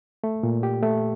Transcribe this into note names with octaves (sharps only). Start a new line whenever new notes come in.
A3
A#2
G4
A3